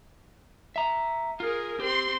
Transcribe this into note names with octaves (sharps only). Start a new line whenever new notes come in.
E5 A#5
F4 G#4 A#4
C4 G4 C6